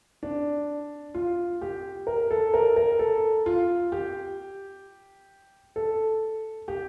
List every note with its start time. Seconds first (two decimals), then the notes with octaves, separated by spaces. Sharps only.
0.23 D4
1.14 F4
1.61 G4
2.07 A#4
2.31 A4
2.54 A#4
2.76 A#4
2.99 A4
3.46 F4
3.92 G4
5.76 A4
6.68 G4